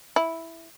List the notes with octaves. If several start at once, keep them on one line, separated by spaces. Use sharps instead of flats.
E4